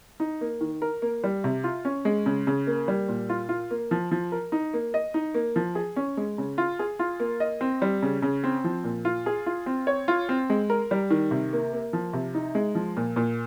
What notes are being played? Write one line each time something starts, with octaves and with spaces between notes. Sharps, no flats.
D#4
A#3
D#3
A#4
A#3
G3
C3
F4
C#4
G#3
C#3
C#3
A#3
G3
A#2
F4
F4
A#3
F3
F3
A#4
D#4
A#3
D#5
D#4
A#3
F3
G#4
C#4
G#3
C#3
F4
G#4
F4
A#3
D#5
C4
G3
C#3
C#3
C4
F3
A#2
F4
G#4
F4
C4
C#5
F4
C4
G#3
A#4
G3
D#3
C3
A#3
A#3
F3
C3
D#4
G#3
F3
A#2
A#2